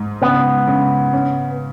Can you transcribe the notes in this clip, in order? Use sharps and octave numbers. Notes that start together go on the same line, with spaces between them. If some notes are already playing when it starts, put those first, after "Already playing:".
Already playing: G#2
C#3 B3
C#3
C#4